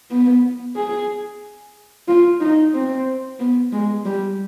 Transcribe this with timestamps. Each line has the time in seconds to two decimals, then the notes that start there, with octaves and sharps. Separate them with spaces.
0.10 B3
0.76 G#4
2.08 F4
2.40 D#4
2.74 C4
3.39 B3
3.72 G#3
4.06 G3